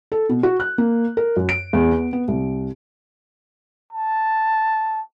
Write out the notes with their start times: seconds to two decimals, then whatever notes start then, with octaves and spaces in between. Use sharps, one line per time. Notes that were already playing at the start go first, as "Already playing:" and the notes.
0.12 A4
0.29 B2
0.43 F#4
0.60 F#6
0.78 A#3
1.17 A#4
1.36 F#2
1.49 D7
1.73 E2
1.91 B3
2.13 B3
2.28 C2
3.93 A5